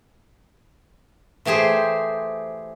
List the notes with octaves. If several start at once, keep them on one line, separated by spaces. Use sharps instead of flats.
E3 A3 G4 G#4 C5